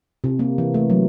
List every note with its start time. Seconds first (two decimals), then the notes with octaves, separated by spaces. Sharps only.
0.24 C3
0.39 A#3
0.58 E3
0.74 A3
0.90 F#3